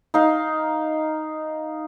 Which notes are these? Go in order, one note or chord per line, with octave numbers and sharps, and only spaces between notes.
D#4 F5